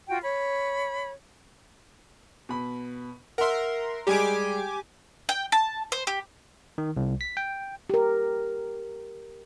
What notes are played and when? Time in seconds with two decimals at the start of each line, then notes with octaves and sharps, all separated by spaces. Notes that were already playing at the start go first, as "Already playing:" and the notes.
0.08 F4 F#4 G5
0.24 C#5 B5
2.49 B2 B5
3.38 A#4 E5 F#5 C6
4.07 G3 G#3 G4 G#4 G#5 D6
5.29 G5
5.52 A5
5.92 C5
6.07 G4
6.78 D#3
6.97 C2
7.21 B6
7.37 G5
7.90 G4 A#4